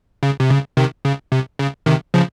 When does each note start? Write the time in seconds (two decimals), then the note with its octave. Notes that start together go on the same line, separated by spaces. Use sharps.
0.23 C#3
0.40 C3
0.50 C#3
0.77 C3 D#3
1.05 C#3
1.32 C3
1.59 C#3
1.86 C3 D#3
2.14 C#3 F3